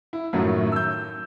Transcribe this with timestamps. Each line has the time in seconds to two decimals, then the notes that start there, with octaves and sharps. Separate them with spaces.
0.13 E4
0.33 F#2 A2 D#3 F3 F#3
0.72 E6 G6